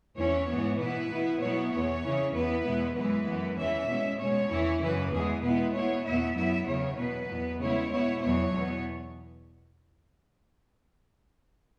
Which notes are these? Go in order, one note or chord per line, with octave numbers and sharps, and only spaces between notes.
E2 E3 C#4 E4 C#5
G#2 E3 G#3 B3
B2 B3 E4 B4
B2 B3 E4
B2 F#3 B3 E4 C#5
E2 E3 B3 C#5
C#3 E3 C#4 E4
E2 E3 B3 E4 B4
E2 B2 G#3 B3 E4
F#2 E3 G#3 E4 B4
F#2 E3 B3
E2 E3 C#4 E5
B2 G#3 C#4
B2 G#3 C#4 C#5
E2 E3 C#4 E4
F#2 C#3 E3 B4
E2 E3 G#3 B3 G#4
B2 G#3 B3 E4 B4
B2 B3 E4 C#5
E2 B2 B3 E4 E5
F#2 F#3 B3 E4 E5
E2 C#3 F#3 C#5
B2 F#3 B3 B4
E2 B2 B3
C#3 G#3 B3 E4 C#5
B2 B3 E4 C#5
E2 B2 F#3 B3 C#5
E2 B2 B3